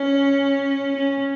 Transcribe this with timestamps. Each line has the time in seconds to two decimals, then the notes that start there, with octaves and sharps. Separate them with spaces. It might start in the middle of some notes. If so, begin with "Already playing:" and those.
Already playing: C#4
0.96 C#4